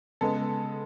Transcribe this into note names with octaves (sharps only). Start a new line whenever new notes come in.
C#3 G#3 B3 A4